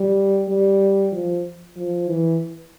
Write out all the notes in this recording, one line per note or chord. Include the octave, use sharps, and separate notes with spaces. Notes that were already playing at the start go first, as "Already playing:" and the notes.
Already playing: G3
G3
F3
F3
E3